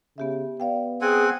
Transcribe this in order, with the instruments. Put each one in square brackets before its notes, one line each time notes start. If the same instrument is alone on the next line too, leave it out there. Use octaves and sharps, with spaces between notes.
[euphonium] C#3 [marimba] B3 G4 E5
[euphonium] B3 [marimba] D5 F5 G5
[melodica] C4 F#5 G#5 [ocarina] G#4